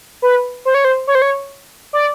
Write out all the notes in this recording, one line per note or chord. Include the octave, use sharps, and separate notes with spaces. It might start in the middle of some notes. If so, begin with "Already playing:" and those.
B4
C5
C#5
C5
C#5
C5
C#5
D5